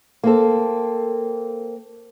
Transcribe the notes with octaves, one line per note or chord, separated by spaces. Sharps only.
A#3 C4 A4